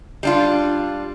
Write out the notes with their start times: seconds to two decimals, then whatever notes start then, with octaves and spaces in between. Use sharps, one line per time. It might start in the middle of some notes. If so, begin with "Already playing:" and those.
0.23 G3 D4 F4